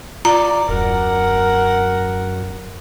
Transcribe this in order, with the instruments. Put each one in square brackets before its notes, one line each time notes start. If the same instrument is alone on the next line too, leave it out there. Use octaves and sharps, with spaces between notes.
[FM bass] F4 [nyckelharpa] D5 [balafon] A#5
[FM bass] D#1 [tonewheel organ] F#2 [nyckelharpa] A#4 F#5